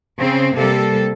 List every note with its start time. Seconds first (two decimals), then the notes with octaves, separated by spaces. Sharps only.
0.19 C#3 C4
0.56 C3 G3 A#3 A4